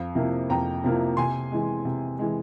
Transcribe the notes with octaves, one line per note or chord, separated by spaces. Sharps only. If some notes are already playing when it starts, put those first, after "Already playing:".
Already playing: F2 F5
C3 F3 A#3 E4
F2 G5 A#5
C3 F3 A#3 E4
C3 G#5 C6
E3 G#3
C3
E3 G#3